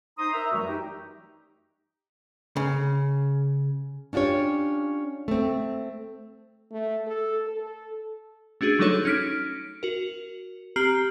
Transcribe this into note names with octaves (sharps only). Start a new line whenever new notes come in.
D#4 C5 A#5 C6 D#6
A#4 E5 A#5
F#2 E3 F#3 G3 A3 F#4
D#4 G4
C#3
C#4 D4 F4 G4 C#5
A3 C4
A3
A4
A4
A3 C#4 D4 F#4 G#4
F#3 G3 A3 D#4 A4 C#5
C#4 D#4 F6 B6 D7
F#4 A#4
C4 G4 A#5 F6 C7 F#7